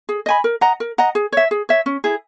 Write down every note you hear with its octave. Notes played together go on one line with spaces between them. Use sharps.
G#4
D#5 G#5 B5
A#4
D#5 F#5 A#5
A#4
D#5 F#5 A#5
G#4
C#5 E5
G#4
C#5 E5
C#4
E4 G#4